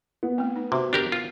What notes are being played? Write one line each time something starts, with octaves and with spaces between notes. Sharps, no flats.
B3
A3 C4
D#4
C3 F#4 C5 E5
D4 G4 A#4
F4